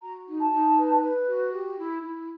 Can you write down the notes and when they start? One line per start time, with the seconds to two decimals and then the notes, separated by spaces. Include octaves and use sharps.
0.01 F#4 A#5
0.27 D#4
0.39 A5
0.51 D#4
0.77 B4
1.02 B4
1.27 F#4
1.53 G4
1.77 E4
2.03 E4